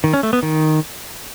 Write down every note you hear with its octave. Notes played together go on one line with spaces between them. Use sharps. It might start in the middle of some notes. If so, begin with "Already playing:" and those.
D#3
C#4
A3
B3
D#3